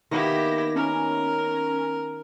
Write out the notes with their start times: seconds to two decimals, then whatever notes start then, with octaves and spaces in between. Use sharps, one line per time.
0.11 D#3 A#3 B3 E4 G4 A#6
0.76 C#4 A#4